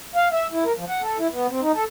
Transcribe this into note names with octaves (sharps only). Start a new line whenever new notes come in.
F5
E5
E4
A#4
F3
F#5
A4
E4
B3
C4
D#4
A4